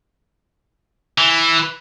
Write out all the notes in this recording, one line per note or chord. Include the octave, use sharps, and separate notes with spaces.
E3